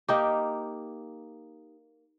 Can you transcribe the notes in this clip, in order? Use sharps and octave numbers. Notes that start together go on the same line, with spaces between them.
A#3 D#4 G4